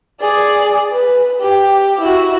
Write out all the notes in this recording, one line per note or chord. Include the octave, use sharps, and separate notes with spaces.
G#4 D5
B4
G4
E4 F#4